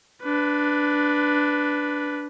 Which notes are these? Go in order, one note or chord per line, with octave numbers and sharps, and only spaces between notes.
D4 B4